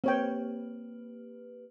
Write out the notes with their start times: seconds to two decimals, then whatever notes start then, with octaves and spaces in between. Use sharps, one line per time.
0.04 A#3 C4 G4 B4 C#5 G5